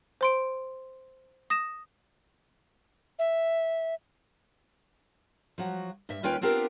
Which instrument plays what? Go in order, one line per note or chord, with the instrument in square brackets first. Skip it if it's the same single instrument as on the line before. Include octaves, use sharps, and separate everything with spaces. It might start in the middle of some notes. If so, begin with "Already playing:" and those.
[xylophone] C5 C6 D7
D#6 A#6 E7
[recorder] E5
[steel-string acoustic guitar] F3 F#3 F#4
G2 E5
D#2 C#4 F4 B4 G5
B3 C4 D4 F4 G4 A#4